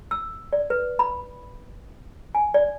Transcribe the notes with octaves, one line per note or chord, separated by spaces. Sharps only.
E6
D5
B4
B5
G#5
D5